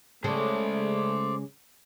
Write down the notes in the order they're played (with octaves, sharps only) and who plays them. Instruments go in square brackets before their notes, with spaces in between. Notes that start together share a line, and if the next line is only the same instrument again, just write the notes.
[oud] C#3 G#3 A4 [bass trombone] A3 [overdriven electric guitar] C5 D5